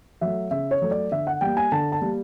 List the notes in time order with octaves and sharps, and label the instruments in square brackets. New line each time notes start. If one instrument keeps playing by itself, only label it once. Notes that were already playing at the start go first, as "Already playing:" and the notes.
[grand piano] F#3 A3 E5
C#3 E5
C#5
F#3 A3
D5
D3 E5
F#5
G3 A#3 G5
G#5
D3 A5
A5
G3 A#3